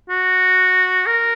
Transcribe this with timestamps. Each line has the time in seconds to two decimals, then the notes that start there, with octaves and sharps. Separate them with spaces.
0.10 F#4
1.07 A#4